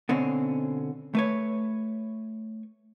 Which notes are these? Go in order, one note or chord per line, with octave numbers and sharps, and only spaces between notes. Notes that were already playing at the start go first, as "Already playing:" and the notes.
B2 D3 C4 C#4
A3 B4 C#5